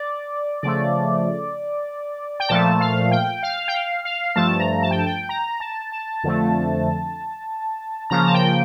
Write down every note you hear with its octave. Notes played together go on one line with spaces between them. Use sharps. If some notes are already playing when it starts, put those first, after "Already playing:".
Already playing: D5
C#3 F3 A3 D5
G5
A#2 F3 A3 A5
F5
G5
F5
G5
F5
F5
G2 F3 A3 A5
A#5
A5
G5
A5
G5
A#5
A5
A5
F2 D3 F3 A3
C#3 F3 A#3 A#5
A5
G5